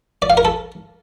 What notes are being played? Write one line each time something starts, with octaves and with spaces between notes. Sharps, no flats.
D5
F5
A#4
A4